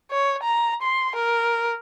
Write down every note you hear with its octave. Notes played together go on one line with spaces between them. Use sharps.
C#5
A#5
C6
A#4